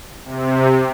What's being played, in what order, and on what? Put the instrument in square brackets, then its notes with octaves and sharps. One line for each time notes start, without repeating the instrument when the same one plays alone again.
[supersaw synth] C3